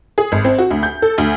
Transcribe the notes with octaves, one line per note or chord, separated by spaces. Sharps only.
G#4
G#1
C4
F#4
D2
G6
A4
D2